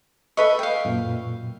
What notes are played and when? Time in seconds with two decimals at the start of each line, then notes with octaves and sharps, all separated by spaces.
0.37 A4 B4 D#5 E5 B5 C#6
0.59 F5 G5
0.85 F#2 A#2